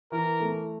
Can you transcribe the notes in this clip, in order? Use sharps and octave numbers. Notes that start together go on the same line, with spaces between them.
E3 A#4
A3